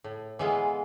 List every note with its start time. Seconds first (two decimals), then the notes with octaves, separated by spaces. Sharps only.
0.04 A2
0.39 E3 G#3 B3 F4